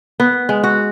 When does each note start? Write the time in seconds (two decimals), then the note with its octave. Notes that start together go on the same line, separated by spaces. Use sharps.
0.20 B3
0.49 G#3
0.64 F#4